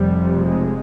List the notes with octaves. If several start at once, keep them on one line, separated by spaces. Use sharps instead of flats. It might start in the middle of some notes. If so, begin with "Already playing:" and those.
Already playing: F1 F2 C3 G3
G#3